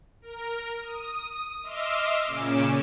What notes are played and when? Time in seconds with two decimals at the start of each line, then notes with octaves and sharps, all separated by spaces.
0.22 A#4
0.81 D#6
1.63 D#5 E5 C6 D6 E6 F6
2.27 A#2 C#3 C#4 D6 E7